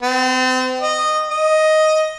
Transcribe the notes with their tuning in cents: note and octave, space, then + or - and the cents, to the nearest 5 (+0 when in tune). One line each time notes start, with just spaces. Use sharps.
C4 -35
D#5 -15
D#5 +5